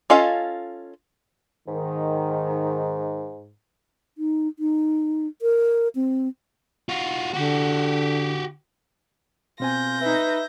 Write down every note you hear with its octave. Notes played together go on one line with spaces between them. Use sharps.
C#4 F4 A4 D#5 F5
G#2 D#3
D#4
D#4
A#4
C4
F4 F#4
D3 F#4 G4
B2 C4 F4 G#5 G6 A#6
D#4 B4 E5